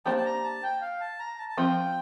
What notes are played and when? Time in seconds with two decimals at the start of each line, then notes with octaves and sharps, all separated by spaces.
0.06 A#3 D4 G4 C5 A5
0.16 A5
0.25 A#5
0.44 A5
0.63 G5
0.81 F5
1.00 A5
1.19 A#5
1.38 A5
1.49 A5
1.58 F3 C4 F4 G5